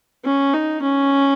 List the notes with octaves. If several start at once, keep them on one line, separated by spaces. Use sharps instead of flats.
C#4
D#4
C#4